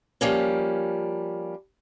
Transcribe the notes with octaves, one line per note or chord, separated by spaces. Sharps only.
F3 G3 A#3 C#4